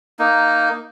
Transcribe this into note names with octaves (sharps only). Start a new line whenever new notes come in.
A#3 D#4